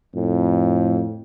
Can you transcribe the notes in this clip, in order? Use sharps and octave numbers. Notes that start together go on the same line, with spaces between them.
F2 A2